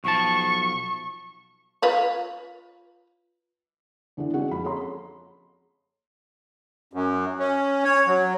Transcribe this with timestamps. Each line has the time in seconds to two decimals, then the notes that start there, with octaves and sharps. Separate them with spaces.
0.04 B1 F3 A5 C#6
1.82 F4 B4 C#5
4.17 E2 D3 E3 D4
4.34 G#3 C4 C#4 F#4 G#4 F#5
4.51 F2 B5
4.65 G#4 A4 C#5 A#5 C6
6.93 F#2
7.39 C#4
7.84 C#5
8.07 F#3